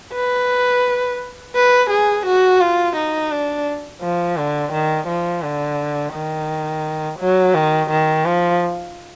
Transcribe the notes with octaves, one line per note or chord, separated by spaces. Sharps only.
B4
B4
G#4
F#4
F4
D#4
D4
F3
D3
D#3
F3
D3
D#3
F#3
D#3
D#3
F3